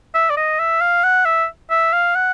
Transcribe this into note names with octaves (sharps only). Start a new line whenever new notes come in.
E5
D5
D#5
E5
F5
F#5
E5
E5
F5
F#5